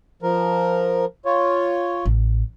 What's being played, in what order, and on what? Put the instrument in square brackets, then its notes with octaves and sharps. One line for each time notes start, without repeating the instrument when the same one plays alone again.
[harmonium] F3 A#4
F4 C#5
[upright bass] A1